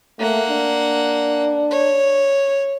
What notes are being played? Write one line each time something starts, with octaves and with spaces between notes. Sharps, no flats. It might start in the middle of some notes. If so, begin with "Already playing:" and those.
A3 A#3 F#5
D4
C#5